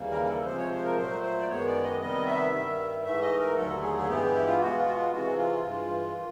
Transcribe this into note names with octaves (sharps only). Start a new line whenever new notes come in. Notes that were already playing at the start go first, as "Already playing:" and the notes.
Already playing: D#2 C#3 E3 G3 A#3
A#4
A#4
A4
C3 F3 G#3 C5
C#5
C5
A#4
A#2 F#3 A3 C5
C5
D5
F#2 D#3 G#3 B3 C#5
D5
D#5
C3 D#3 G3 B3 D#5
E5
G2 D#3 G3
G#2 E3 A3 E5
D#5
A#4
D#2 D3 F#3 A3 A4
G#4
G#4
G2 E3 G#3 B3 G4
E4
F4
B2 G#3 B3 F#4
F4
F#4
F4
C3 E3 G#3 F#4
F4
G2 E3 G#3
D#3